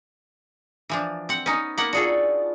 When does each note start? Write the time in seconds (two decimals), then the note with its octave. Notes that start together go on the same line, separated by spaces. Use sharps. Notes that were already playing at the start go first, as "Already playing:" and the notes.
0.90 E3 F3 D4
1.29 C4 F#5
1.46 B3 C#4 D#4
1.78 A#3 B3 F#5
1.93 D4 F4 F#4 G#4 A4